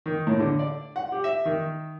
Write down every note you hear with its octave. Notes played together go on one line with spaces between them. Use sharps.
D#3
A2
D3
D5
F#5
G4
E5
D#3